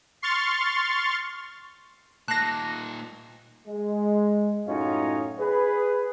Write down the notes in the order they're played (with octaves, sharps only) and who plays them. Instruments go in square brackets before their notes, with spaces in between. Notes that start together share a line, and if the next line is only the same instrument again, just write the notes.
[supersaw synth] C6 C#6 F6 A6
[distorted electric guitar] A#2 D#4 [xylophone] A5 C7 [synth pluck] F#6 A#6
[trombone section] G#3
F#2 A2 C#4 D#4 F4 F#4
G#4 B4